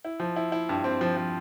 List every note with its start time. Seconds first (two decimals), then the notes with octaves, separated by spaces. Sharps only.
0.05 E4
0.20 F3
0.36 E4
0.52 E4
0.69 G2
0.84 C4
1.01 F3
1.17 F3